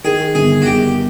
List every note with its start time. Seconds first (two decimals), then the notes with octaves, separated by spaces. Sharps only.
0.04 D#3 G#4
0.35 G1 G#4
0.62 F#4
0.66 G1 G4